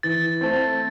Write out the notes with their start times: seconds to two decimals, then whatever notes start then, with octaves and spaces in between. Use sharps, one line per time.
0.03 E3 A6
0.41 A3 C4